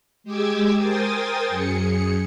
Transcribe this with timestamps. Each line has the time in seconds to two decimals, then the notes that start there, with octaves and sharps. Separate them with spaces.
0.24 G#3 G4 G#4 D6 E6 G#6
0.77 A#4 C5 G5 G#5 D#6 A6
1.49 F#2 G#4 C#7